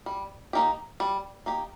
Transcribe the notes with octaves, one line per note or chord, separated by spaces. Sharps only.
G3
A#3 D#4 G4
G3
A#3 D#4 G4